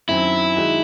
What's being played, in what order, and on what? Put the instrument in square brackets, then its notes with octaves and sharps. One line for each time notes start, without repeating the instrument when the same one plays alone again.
[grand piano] F#2 D#3 F#3 C4 [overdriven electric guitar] E4
[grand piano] D#3 G#3 D#4 F#4